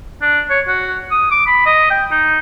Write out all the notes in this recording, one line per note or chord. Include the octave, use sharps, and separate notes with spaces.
D4
C#5
F#4
D#6
D6
B5
D#5
G5
D#4